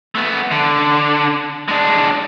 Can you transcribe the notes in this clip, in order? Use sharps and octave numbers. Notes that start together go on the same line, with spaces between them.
A3 B3
D3
G#3 D4